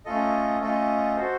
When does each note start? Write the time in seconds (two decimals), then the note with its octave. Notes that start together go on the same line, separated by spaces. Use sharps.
0.05 A3 C#4 F4 A4 D#5
0.60 A3 C#4 F4 A4 D#5
1.16 F#4 A4 C5